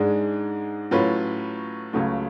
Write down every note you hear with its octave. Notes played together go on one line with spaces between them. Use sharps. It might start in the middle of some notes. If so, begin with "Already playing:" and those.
Already playing: G#2 G#3 D4 G#4
A2 F#3 C#4 F4 B4
C#2 C#3 F#3 A3